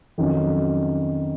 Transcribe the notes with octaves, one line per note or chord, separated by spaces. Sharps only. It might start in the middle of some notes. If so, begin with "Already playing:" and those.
F2 D#3 F#3 C#4